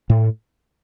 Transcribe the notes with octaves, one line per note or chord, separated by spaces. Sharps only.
A2